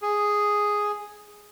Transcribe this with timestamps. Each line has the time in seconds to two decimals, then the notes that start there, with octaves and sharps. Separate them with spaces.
0.02 G#4